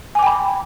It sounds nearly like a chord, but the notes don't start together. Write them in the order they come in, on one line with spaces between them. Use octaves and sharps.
G#5 D6 G5 B5